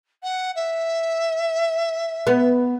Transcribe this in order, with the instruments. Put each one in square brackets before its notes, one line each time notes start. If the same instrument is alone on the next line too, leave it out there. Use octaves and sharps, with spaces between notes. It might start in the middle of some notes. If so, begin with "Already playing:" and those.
[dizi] F#5
E5
[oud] B3